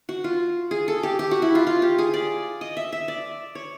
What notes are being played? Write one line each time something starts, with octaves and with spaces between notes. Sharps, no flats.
F#4
F4
G#4
A4
G4
G4
F#4
E4
F4
F4
G4
G#4
D5
D#5
E5
E5
D5
C#5